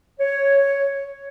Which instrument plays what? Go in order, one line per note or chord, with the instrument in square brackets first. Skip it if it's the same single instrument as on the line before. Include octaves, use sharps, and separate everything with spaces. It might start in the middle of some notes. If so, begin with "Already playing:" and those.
[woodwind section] C#5